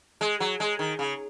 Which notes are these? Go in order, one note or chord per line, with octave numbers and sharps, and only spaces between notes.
G#3
F#3
G#3
D#3
C#3